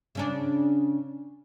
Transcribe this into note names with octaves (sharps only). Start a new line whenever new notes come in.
C#3 C#4 D4